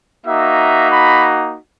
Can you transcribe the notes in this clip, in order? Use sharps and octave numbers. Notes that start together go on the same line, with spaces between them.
A#3 D#4 F#4 E5
B5